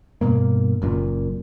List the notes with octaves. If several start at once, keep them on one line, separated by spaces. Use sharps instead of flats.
G2 B2 A#3
F#1 F#2 A#2